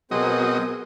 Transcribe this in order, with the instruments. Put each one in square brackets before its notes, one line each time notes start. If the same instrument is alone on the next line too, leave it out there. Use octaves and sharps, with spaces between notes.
[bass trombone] B2 [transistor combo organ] F#3 D#5 [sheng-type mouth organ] C4 G#4 C5 [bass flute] A#4